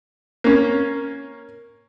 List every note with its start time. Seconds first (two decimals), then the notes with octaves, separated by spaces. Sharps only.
0.44 A#3 C#4